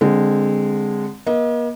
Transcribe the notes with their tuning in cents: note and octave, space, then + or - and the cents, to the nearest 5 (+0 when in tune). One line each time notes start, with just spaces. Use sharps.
D3 +0 G#3 -15 C4 +5
A#3 +45 D#5 +25